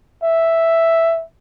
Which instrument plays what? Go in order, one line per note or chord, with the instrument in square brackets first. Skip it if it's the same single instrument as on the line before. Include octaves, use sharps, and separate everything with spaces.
[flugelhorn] E5